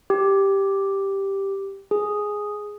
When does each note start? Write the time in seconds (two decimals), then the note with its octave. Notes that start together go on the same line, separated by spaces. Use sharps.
0.10 G4
1.91 G#4